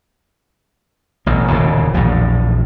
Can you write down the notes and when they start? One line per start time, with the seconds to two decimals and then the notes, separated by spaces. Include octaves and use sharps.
1.26 A1 B2
1.50 E1 D#2 A#2 C#3
1.94 A#1 E2 A2